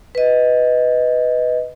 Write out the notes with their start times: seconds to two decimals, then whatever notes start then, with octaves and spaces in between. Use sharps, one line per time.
0.15 B4 D#5